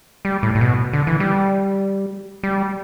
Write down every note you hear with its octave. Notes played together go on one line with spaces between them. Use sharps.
G3
A2
A2
B2
D3
E3
G3
G3